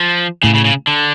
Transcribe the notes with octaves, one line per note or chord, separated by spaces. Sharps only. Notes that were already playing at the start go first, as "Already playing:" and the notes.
Already playing: F3
A2 C#3
C#3
C#3
D3